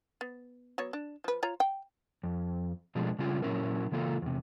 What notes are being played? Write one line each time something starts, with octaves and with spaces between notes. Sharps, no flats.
B3
F#3 B3 C#5
D4
F3 B4
F4 C#5 A#5
G5
F2
B2 F3 G#3 A3 D4 G#4
C#3 G3 A3 C#4 F4
A#2 C#3 F#3 C#4 E4 A#4
C#3 E3 A#3 F4 A4
E2 C3